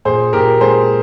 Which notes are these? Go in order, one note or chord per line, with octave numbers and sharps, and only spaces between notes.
A#2 G#4 C5
A#2 G4 A#4
G#3 G#4 C5